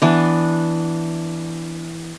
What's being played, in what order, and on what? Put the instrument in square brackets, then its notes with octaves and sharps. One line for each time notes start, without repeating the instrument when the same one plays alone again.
[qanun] E3 B3 D4